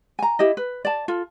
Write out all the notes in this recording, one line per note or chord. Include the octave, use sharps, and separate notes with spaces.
G#5 A#5
E4 G4 D#5
B4
D5 A5
F4 A4